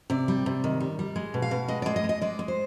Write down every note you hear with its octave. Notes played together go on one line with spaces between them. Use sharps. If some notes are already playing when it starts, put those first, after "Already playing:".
C3 D5
G3
C3
D#3
G3
G3
G#3
B2
F5
B2
G#3 D#5
G#3 D5
D#5
G#3
D#5
G#3 D5
G#3
C5